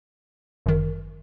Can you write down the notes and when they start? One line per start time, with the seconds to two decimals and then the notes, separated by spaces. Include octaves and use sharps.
0.66 G1 F#2 D#3